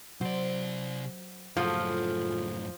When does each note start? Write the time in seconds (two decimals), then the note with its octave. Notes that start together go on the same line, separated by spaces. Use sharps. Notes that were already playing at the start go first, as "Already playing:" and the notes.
0.21 C3 F#3 C5 D5
1.57 F#2 A2 C#3 F3 F4 F#4 A4